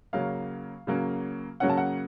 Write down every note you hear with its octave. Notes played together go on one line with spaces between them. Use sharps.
C#3 F#3 A#3 C#4 F5
C#3 F#3 A#3 C#4
C#3 F#3 A#3 C#4 F#5
A5
F#5